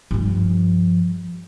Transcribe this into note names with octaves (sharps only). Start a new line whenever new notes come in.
G2 F3